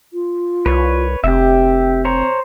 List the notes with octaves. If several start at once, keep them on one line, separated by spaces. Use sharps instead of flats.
F4
C2 B4 C#5
F1 C4 G4 E5
C5 C#5 A#5